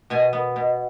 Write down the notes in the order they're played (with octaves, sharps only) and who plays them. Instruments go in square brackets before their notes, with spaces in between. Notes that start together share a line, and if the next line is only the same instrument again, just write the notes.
[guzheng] B2 G#5
B3
B2